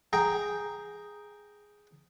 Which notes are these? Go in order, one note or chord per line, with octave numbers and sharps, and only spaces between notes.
G#4 G5 A#5